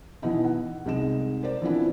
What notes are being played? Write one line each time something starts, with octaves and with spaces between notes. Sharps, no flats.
B2 E3 B3 D#4 E4
F#5
C2 G#3 D#4 E7
A#4 C5 D5
E3 F3 B3 C4 D4 E4